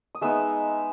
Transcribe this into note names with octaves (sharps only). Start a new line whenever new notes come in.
D#6
G#3 B3 D#4 E5 E6